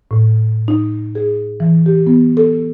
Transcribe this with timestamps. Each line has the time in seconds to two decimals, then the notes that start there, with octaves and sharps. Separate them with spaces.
0.11 A2
0.68 D#4
1.15 G#4
1.60 E3
1.86 G4
2.07 B3
2.37 A4